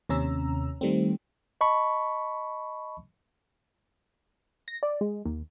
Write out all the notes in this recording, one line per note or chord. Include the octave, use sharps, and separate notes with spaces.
D#2 C3 C#4 A#5 E6
D#3 G3 A3 C4
D#5 A5 B5 C#6
A#6
D5
G#3
D#2